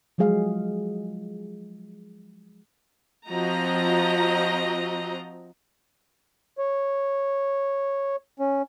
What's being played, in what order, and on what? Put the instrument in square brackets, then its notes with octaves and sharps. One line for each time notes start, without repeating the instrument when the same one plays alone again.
[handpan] F3 F#3 G#3 G#4 F5
[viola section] F3 C4 F#4 D#5 A#5
[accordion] C#5
C#4